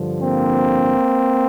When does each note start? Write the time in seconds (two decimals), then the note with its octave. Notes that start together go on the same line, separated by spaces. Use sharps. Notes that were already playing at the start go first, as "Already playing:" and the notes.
Already playing: G2 D3 F3
0.20 A#3 C4